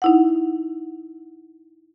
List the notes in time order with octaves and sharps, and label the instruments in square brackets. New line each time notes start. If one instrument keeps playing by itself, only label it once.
[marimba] D#4 E4 F#5